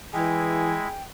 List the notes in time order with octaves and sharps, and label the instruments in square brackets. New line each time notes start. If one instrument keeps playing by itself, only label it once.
[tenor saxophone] E3 [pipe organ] G#3 E4 [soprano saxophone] G#4 [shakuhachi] G5